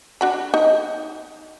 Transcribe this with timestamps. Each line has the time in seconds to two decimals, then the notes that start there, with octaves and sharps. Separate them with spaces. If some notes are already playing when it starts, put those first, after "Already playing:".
0.21 D4 F#4 B5
0.54 D#4